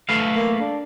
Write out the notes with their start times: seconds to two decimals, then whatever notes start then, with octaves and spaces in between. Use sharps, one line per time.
0.09 A3 B4 F5
0.36 A#3
0.60 D4